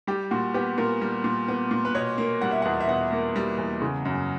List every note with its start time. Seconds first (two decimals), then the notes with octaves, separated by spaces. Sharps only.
0.07 G3 G4
0.31 A#2 F#4
0.54 B3 G4
0.78 A#2 A#4
1.01 G3
1.24 A#2
1.48 B3
1.71 A#2
1.85 B4
1.95 B2 C#5
2.18 A#3
2.42 G3 F#5
2.51 E5
2.62 E2 F#5
2.80 E5
2.88 B2 F#5
3.12 A#3
3.36 G3
3.58 E2
3.82 C#3
4.05 F#2